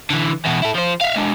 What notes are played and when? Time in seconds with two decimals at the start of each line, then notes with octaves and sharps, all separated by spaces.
0.10 D3 E3
0.45 E2 B2
0.62 E4 A4
0.74 F3 C5
1.01 E5 F5
1.16 G#3 D4